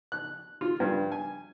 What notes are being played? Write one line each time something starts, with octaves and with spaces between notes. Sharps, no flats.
F#6
F4
G2
G#5